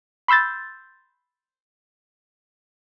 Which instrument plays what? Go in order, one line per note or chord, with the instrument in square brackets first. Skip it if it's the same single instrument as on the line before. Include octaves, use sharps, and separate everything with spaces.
[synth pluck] B5 C6 E6 G6 A6